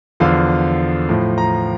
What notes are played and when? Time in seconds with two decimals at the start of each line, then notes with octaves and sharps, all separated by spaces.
0.20 E2 D3 F3 F5
1.09 A2 F3
1.38 A#5